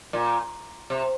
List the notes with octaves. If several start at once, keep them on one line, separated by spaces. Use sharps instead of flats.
A#2
C3